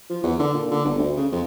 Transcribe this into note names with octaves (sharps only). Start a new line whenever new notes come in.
F3
E2
D3
A#2
D3
G1
D2
C#3
F2